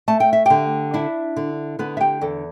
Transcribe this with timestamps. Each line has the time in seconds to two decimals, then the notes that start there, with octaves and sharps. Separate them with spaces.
0.08 A3 A5
0.20 G5
0.33 E5
0.46 D3 G4 G5
0.94 D4 E4 E5
1.36 D3
1.79 D3 B3 B4
1.97 E5
2.01 G4 G5
2.21 E2 A4